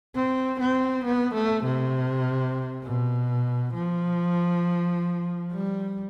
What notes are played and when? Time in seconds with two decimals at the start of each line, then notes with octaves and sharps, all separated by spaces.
0.15 C4
0.60 C4
1.05 B3
1.34 A3
1.64 C3
2.84 B2
3.74 F3
5.52 G3